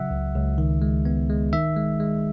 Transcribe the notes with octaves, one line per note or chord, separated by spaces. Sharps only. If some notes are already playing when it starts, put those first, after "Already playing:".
Already playing: C#3 F#3 E5 F#5
C#2
C#2
D#3
G#3
B3
G#3
D#3 E5
G#3
G#3